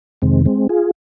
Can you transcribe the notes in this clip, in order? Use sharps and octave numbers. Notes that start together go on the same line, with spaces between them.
F2 C3 D#3 G#3 C4
G#3 C4
F4 G#4